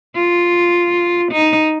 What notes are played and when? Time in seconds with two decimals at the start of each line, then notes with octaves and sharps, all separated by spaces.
0.15 F4
1.32 D#4